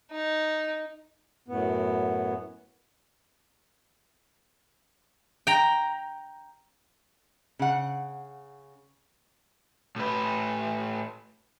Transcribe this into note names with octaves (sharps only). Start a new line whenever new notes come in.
D#4
F#2 A2 B3
G5 A#5
C#3 F#5
A2 B4